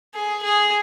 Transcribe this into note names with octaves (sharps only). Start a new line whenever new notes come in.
G#4
G#4